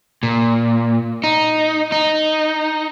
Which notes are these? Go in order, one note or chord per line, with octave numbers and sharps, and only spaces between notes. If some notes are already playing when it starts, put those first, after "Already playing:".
A#2
D#4
D#4